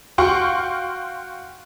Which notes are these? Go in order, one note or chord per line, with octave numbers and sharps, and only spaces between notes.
F#4 F5 G5 C6 C#6